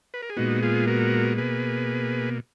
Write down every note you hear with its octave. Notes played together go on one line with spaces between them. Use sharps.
B4
A#4
G#4
A#2 G#3 B3 D#4 F#4
F4 G#4
F#4 A#4
B2 A#3 G#4 B4